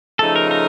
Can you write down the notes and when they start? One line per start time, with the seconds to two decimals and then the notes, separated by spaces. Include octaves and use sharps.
0.19 C#3 F3 A3 D#4 A4
0.36 A#4
0.51 A#4